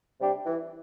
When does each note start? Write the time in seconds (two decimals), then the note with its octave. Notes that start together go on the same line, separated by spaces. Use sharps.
0.19 C3 G3 D4 G4
0.46 E3